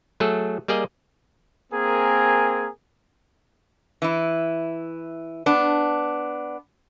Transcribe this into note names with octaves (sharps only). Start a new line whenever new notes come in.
F#3 A3 G#4 A4
G3 A#3 G#4 D5 D#5
A#3 C4 G#4 A#4 G#5
E3 E4
B3 D4